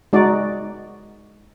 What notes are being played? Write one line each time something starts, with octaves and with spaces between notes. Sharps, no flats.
G#3 D#4 F#4 D5